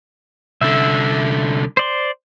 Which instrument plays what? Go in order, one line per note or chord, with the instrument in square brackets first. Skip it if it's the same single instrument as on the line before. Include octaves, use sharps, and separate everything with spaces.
[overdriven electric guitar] C2 D3 [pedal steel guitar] E5
[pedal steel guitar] C5 D5 C6